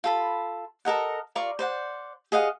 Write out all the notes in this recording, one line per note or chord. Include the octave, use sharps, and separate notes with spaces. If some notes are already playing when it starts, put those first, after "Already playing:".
F4 A4 B5
A4 A#4 D#5 F#5
F4 A#4 D5 C#6
C5 D5 F#5
G#4 D#5 F5 F#5